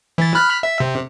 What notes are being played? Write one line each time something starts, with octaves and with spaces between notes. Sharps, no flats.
E3 A6
B5 F6 F#6
E5
C3